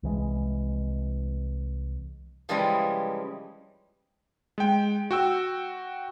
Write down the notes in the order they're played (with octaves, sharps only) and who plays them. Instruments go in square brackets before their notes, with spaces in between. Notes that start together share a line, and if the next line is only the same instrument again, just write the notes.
[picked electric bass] C2 E3 G#3
[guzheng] C#3 E3 F3 G3 G#3
[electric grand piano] G#3 G5
F#4 G5 E6